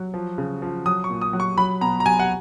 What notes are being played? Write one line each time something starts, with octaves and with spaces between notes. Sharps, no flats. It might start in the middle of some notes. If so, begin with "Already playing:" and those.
Already playing: F#3
F3
C#3
F3
F#3 D#6
C#6
A#2
D#6
F#3
C#6
F#3 B5
B2 A#5
A#5
F#3 G#5
F#5